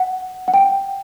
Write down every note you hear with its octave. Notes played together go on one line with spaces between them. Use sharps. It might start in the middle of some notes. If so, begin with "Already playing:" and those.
Already playing: F#5
F#5
G5